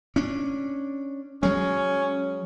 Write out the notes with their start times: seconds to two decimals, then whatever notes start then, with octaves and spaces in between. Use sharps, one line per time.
0.16 C#4 D4
1.43 F#3 G#3 C#4